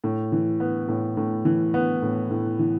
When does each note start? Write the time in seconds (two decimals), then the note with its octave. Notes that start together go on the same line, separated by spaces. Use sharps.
0.04 A2
0.32 E3
0.60 B3
0.88 A2
1.17 A2
1.45 E3
1.74 B3
2.02 A2
2.31 A2
2.59 E3